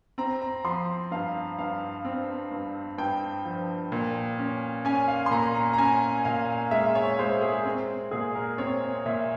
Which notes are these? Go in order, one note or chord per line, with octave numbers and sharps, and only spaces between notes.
C4 A#5
A#5
F3 C6
G2 F5
G2 F5
C4
G2
G2 G5
F3
A#2
C#4
C#4 G#5
F5
C6
A#2 A#5
A#5
A#5
C#4 G#5
A#2 F5
G#3 E5
C#5
G#3 C5
G#4
C4
A#2 G#4
A#4
C4 C#5
A#2 E5